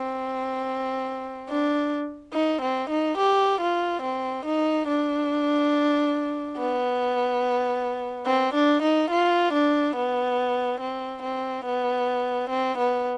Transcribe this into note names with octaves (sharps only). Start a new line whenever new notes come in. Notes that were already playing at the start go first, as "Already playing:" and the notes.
Already playing: C4
D4
D#4
C4
D#4
G4
F4
C4
D#4
D4
B3
C4
D4
D#4
F4
D4
B3
C4
C4
B3
C4
B3